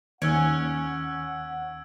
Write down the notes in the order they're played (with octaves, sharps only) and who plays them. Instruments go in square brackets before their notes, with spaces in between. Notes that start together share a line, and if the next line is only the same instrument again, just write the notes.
[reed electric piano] D#2 F#6 [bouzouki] C#4 [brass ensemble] F#5 [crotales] E6 G#6 D7